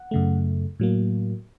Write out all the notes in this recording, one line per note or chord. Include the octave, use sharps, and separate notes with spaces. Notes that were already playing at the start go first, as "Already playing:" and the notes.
Already playing: F#5
F#2 C#3 A3
A2 F#3 A#3